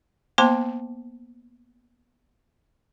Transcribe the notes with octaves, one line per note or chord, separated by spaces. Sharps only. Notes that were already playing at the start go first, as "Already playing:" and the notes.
A#3 B3 C5 A5 C6 D6